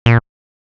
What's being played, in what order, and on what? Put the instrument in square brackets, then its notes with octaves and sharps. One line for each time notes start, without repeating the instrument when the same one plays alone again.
[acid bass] A#2